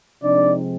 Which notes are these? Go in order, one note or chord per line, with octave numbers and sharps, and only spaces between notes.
C3 F3 G#3 C4 D4 D#4 D5